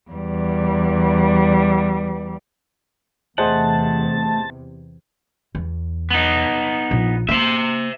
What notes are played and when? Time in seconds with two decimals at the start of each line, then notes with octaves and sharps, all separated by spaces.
0.11 E2 G3
3.38 E2 C3 A3 G#4 C5 D#5 F#5 A5
5.55 E2
6.10 B3 D#4
6.91 A#1
7.29 A#3 C5 E5